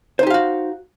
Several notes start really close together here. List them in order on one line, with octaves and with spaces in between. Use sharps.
C5 D#4 G4 F5 F#4